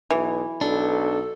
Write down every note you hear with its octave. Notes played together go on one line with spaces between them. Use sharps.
B1 E3
B1 D4 A4